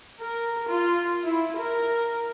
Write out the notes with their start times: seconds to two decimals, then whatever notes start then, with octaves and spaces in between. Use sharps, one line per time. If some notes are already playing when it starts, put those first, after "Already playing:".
0.20 A#4
0.68 F4
1.24 E4
1.58 A#4